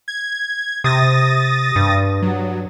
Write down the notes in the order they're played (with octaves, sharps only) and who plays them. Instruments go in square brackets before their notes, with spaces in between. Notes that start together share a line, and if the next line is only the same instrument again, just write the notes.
[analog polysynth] G#6
[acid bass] C3 [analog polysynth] D#6 A6 A#6
[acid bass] G2
[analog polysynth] F#3